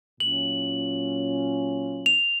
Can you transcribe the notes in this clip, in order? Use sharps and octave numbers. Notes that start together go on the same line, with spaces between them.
A#2 F#3 C#4 F4 F#7
F7